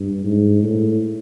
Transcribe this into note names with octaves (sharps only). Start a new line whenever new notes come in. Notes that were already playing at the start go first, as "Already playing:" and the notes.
Already playing: G2
G#2
A2